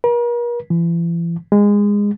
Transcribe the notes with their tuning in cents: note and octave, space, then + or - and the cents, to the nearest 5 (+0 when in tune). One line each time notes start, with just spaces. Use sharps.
A#4 +45
E3 +40
G#3 -20